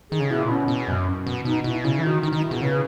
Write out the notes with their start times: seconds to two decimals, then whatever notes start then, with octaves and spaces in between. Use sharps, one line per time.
0.11 D#3 G#4
0.20 C#3
0.29 B2 E4
0.39 A#2
0.48 B2 C#4
0.68 B2
0.88 F#2
1.27 B2
1.45 B2 D#4
1.64 B2 E4
1.84 C#3 E4
1.99 E3
2.03 D#3 F#4
2.22 D#3 D#4
2.32 D#3 D#4
2.43 E4
2.51 B2 G#4
2.62 C#3 B4